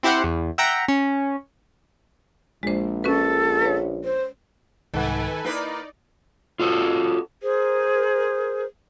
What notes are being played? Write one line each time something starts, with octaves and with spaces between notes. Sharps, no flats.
C4 E4 G4 C5 F#5
E2
E5 F#5 G5 A#5
C#4
A#1 G#3 C5
C#4 F#4 A4 B4
B4 C#5
C5
C2 G#2 D#3 A4 B4 F#5 G#5
A#3 D#4 E4 B4 D5
F4 F#4 A4
G#4 A#4 C5